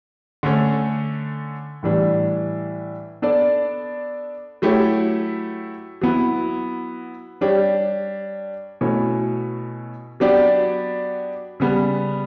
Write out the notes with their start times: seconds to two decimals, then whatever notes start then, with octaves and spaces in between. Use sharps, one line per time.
0.43 D3 A3 C#4
1.83 A2 E3 G3 D4
3.22 B3 D4 A4 D5
4.62 F#3 A3 E4 G4 C#5
6.01 F#3 B3 E4
7.41 G3 D4 G4 C#5
8.81 B2 A3 C#4 E4
10.20 F#3 B3 D4 G4 D5
11.60 C#3 G3 B3